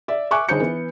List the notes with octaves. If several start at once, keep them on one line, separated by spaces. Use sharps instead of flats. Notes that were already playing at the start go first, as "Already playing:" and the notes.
D5 E5
E5 G#5 C#6 D6 F#6
G1 D#4 G#4 C5 G6 C#7
E3 B3